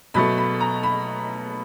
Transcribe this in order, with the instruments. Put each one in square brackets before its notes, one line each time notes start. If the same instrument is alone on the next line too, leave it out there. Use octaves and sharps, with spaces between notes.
[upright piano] B2 F#3 A3 B5
B5
A#5
B5